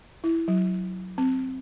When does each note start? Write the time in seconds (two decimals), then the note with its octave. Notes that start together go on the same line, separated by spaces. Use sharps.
0.24 E4
0.48 F#3
1.18 C4